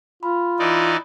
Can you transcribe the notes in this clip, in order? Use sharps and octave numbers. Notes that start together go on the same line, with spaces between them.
F4 B5
E3 D#4 D5